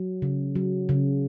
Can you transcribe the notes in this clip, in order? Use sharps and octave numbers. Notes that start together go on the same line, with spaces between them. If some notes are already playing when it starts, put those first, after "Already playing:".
Already playing: F#3
C#3
F#3
C#3